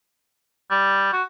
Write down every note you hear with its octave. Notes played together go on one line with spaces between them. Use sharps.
G3
F#4